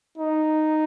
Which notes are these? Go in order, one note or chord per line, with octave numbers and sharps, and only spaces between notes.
D#4